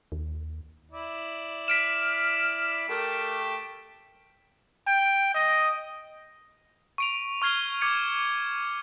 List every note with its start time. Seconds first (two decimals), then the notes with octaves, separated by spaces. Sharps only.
0.12 D#2
0.91 E4 D5
1.68 F6 B6 D7 E7
2.89 A3 G4 A#4
4.87 G5
5.35 D#5
6.98 C#6 D7 F7
7.42 C#6 F6 G#6 C7 G7
7.82 D6 G#6 C#7